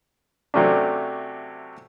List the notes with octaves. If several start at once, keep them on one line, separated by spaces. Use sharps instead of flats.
C3 F#3 A3 C#4 D4